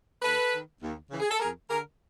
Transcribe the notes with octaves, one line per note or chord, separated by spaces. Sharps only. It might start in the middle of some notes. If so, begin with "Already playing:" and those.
D#2 A4 B4
D#3
D#2
C#3 E3
G#4
A4
F2 G#4 A#4
D3 G#4 A#4